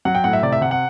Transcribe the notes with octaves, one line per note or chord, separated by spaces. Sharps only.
F#3 F#5
G5
A2 F#5
E5
C3 D5
E5
C3 F#5
F#5